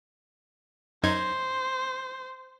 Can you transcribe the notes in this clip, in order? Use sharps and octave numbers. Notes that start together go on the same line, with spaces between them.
F#2 D#4 C5 G#6